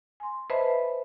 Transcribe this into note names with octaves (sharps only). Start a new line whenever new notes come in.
G#5 C6
B4 C5 D#5 E5 A5 B5